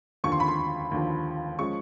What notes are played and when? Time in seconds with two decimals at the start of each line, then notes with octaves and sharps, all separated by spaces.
0.24 D#2 D3 F3 C#6
0.32 C6
0.40 B5
0.48 C6
0.91 D#2 D3 F3
1.59 F3 G#3 C#4 C#6